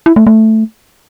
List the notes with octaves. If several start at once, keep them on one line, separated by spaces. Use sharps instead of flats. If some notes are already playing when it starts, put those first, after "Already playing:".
E4
A3
A3